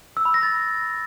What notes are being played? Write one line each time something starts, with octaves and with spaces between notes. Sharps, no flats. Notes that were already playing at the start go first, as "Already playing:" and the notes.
E6
B5
A#6
A6